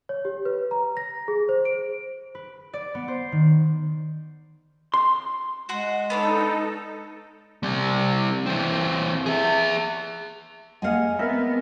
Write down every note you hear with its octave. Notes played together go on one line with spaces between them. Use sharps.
C#5
G4
B4
A#5
A#6
G#4
C5
D7
B4
D5
B3
C5
D#3
C6
G#3 F#4 F#5 C6
B3 D4 D#4 A4 C#5
G3 C4
E3 C4
G#4 E5
G#3 A#3 G#4 F5 F#5 G#5
B3 C4 A#4 E5